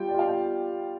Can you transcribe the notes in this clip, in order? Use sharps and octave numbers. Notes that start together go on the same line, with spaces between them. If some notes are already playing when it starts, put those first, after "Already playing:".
Already playing: G3 F4 G5
D5
F4 F5
G5